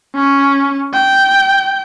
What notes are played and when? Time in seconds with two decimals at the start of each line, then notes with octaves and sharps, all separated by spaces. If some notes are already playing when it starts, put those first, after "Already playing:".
0.15 C#4
0.94 G5